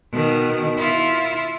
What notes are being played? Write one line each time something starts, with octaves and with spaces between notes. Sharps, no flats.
B2 D#3
E4 F4